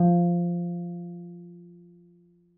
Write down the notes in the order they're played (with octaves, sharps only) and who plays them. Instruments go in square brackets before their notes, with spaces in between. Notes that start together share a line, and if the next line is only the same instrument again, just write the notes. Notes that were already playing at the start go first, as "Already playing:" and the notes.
Already playing: [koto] F3